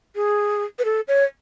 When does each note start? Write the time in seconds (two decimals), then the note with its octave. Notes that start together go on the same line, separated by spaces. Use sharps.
0.16 G#4
0.79 B4
0.85 A4
1.08 C#5